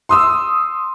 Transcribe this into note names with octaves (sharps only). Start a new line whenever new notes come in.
C6 D#6 E6